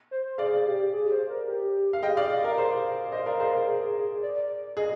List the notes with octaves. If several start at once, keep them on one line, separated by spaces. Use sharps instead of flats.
C5
G#4 D5 F5
G4
G#4
C5
A#4
G4
F5
G#4 D#5 G5
D5 F5
F5
A#4
G#4 C5 F5
C5 D#5 F5
A#4 D5
G#4 C5
A#4
G#4
D5
G#4 D#5